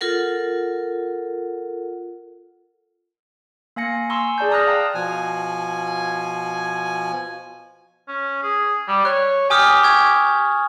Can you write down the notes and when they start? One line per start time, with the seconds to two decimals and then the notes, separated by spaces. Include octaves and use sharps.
0.01 F4 A4 A#4 F#5
3.76 A#3 F5 G#5 A#6 C#7
4.10 G#5 A#5 C6 C#6 E6
4.38 G#4 D5 A5 G6
4.51 A#5 D#6 F6 F#6 A#6
4.67 F5 G5 A5 A#5
4.95 B2 F3 G#5
8.08 C#4
8.42 G#4
8.88 G3
9.05 C#5 F#6
9.50 G4 G#5 D#6 F6
9.83 C#6 G#6